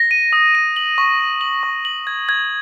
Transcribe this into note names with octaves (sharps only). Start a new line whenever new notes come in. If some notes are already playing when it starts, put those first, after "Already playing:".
Already playing: A#6
D#7
D#6
D#7
F#7
C#6
D#7
F#7
C#6
F#7
G#6
G#6